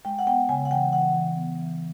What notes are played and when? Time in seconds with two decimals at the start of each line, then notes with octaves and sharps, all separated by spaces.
0.05 G#3 G5
0.19 F#5
0.27 B3 G5
0.49 C#3 G#5
0.65 F#5
0.71 E3 G5
0.93 E3 F#5
1.14 E3
1.37 B3
1.59 E3